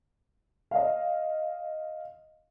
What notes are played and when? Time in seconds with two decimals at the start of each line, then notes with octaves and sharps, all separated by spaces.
0.71 D#5 F5